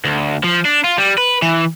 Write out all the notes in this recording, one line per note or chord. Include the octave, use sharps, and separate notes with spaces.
D2
F3
D4
F4
G3
B4
E3